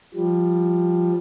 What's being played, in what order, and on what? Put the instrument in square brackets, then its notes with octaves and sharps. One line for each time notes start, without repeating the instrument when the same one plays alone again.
[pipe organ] F3 G3